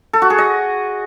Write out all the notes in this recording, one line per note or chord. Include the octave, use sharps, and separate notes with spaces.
A4
F#4
G#4
D#5